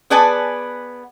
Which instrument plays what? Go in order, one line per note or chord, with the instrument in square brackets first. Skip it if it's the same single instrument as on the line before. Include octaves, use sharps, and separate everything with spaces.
[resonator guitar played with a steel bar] B3 G#4 B4 D5 G#5 A5